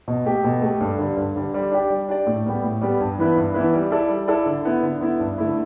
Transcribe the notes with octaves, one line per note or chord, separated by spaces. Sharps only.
B2
A3 G4
B2
A3 G4
G2
D3 G3
G2
D3 G3
G3
D4 G4 D5
G3
D4 G4 D5
A2
G3 B3 G4
A2
G3 B3 G4
G2
E3 B3 E4 B4
G2
E3 B3 E4 B4
G3
E4 A4 D5
G3
E4 A4 D5
D3
B3 E4
D3
B3 E4
G2
D3 A3 E4